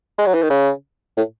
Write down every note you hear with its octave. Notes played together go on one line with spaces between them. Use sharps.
G#3
F#3
E3
D#3
C#3
A2